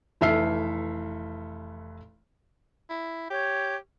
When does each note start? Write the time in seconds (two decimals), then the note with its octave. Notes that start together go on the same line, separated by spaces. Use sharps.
0.21 F1 E3 A4 E5 F6 C7
2.90 E4
3.30 G4 C#5 G6